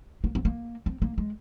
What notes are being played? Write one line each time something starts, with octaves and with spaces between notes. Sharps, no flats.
A#3
C4
A#3
C4
A#3
G#3